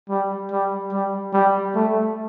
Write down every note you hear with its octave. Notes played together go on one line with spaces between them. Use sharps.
G3
G3
G3
G3
A3